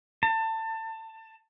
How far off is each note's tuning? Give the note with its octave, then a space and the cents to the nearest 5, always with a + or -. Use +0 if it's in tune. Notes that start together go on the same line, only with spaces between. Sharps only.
A5 +25